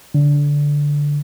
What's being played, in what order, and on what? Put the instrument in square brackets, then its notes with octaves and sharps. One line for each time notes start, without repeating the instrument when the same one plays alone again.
[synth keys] D3